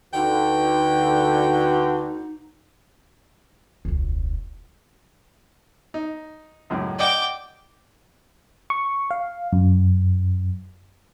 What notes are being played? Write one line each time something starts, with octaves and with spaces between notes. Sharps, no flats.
D2 D3 D#4 F#4 B4 G5
E1 C#2
D#4
C#2 F#2 A2
D5 D#5 F#5 G5 D6
C#6
F5
F#2